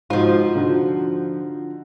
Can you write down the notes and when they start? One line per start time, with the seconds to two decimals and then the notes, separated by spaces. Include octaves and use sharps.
0.10 G#2 F3 F4 F#4
0.55 D3 D#4 F#4